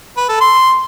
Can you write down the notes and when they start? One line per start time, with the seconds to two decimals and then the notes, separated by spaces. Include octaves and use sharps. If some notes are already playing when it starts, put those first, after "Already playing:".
0.17 B4
0.29 A4
0.41 C6